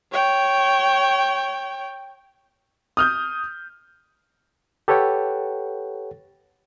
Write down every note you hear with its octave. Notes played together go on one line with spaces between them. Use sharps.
C#5 G5
D#6 F6 G6
G4 A4 B4 C#5 F#5 G5